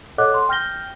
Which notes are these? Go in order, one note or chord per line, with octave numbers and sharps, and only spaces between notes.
A4 C#5 D#5 F#5 D6 F#6
C6
G5 F6 G6 A#6 G7